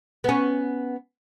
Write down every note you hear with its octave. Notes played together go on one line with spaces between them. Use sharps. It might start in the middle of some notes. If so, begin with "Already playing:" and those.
B3 C#4